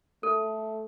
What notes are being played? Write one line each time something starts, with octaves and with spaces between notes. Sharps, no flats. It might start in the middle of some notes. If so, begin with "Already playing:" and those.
A3 A4